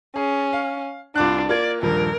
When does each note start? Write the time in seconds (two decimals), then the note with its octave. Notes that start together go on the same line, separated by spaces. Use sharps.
0.16 C#4 G#4
0.53 F5
1.15 C2 D4 F4 D6 F#6
1.49 A#3 F4 D5 G#6
1.82 D#1 G2 F3 A#4